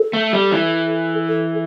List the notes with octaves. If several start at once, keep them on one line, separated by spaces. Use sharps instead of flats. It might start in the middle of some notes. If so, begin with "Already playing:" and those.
Already playing: A4
A3
G3
E3
A4